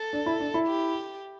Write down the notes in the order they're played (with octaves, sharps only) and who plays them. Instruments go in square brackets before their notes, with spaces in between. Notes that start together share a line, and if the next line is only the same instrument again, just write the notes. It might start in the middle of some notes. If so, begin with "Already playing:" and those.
Already playing: [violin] A4
[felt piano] D4
E4
D4
E4
[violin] G4